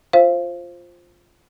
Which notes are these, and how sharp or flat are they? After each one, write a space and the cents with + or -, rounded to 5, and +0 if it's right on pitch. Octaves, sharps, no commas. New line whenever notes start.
F4 +0 C5 +10 F5 -25